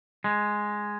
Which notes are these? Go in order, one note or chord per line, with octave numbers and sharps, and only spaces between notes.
G#3